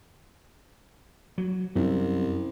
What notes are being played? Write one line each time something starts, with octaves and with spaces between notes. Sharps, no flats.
F#3
C2 F#2